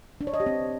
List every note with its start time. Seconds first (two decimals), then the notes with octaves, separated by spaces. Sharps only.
0.21 D4
0.27 C#5
0.34 D#5
0.40 G4
0.46 C4